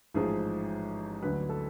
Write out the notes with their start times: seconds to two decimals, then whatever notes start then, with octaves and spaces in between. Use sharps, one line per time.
0.14 A1 G#2 F3 G#3 G#4
1.23 D2 D3 F#3 B4
1.50 A4